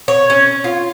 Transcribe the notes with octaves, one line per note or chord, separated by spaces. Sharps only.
C#5
C#4
F4